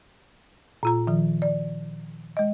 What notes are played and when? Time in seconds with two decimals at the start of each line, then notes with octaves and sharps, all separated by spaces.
0.83 A#2 F4 A#5
1.07 D#3 F3
1.42 D5
2.37 G#3 D#5